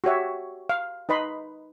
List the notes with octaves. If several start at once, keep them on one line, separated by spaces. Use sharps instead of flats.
F#4 G4 C#5 E5
F5
D#4 B4 D#5 B5 C6